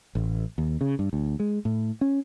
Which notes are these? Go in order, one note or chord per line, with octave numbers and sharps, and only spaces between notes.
A1
D#2
C#3
G2
D2
G#3
A2
C#4